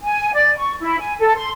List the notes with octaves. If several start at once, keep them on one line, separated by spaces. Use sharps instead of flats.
G#5
D5
C#6
E4
G#5
A4
C6